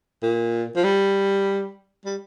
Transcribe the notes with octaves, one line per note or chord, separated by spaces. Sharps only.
A#2
F3
G3
G3